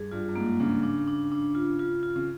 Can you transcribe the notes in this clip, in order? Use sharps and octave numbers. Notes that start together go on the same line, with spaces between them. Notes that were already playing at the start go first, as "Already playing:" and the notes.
Already playing: G2 G#4
G2 F4
G2
G#2 A#3
C#3 D4
D4
D4
D4
F4
F4
F4
C#3